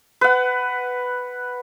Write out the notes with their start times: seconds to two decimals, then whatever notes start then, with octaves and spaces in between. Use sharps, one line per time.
0.21 B4 F#5